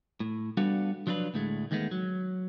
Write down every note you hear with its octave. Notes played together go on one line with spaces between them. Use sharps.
A2
G3 B3 D4 F#4 A4 F5
F3 F#3 D4 F4 B4
D2 A2 G#3 A3
D#2 D#3 G#3 A3 B3
F#3